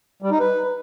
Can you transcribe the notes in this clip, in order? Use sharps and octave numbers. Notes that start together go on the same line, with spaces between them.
G3
D#4
B4